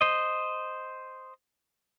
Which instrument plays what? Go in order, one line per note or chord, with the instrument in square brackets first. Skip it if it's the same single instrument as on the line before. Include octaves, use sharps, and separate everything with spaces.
[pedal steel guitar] C5 D#5